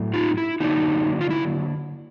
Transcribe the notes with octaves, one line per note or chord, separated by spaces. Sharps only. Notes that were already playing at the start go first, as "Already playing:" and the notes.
Already playing: A2 F#3 A3
D#4 F4
E4
D3 F#3 A#3 D4 D#4
F4
E4